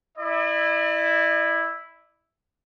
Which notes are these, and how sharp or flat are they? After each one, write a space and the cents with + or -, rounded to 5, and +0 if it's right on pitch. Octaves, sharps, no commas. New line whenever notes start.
E4 +0 D5 +45